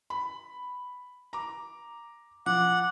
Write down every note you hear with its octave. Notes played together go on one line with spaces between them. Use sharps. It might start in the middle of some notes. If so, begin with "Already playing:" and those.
B5
A#5 D6
F3 F#5 D6